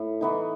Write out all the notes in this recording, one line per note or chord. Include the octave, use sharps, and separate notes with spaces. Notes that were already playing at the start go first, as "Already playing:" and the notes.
Already playing: A2
E3 B3 D#4